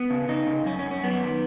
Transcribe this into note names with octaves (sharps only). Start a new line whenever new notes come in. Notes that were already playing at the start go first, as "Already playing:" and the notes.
Already playing: B3
C#3
C#3 D#4
C#3
F#2 C#4
C#4
F#2
C#4
F#2 B3
D#3